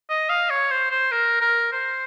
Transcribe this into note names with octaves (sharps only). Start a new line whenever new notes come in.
D#5
F5
C#5
C5
C5
A#4
A#4
C5